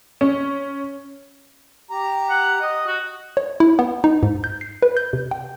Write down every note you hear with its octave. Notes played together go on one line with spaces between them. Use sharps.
C#4
G4 A#5
F#5
D#5
F#4
C#5
E4
B3
D#4
G#2
G6
C7
B4
G6
C3
G5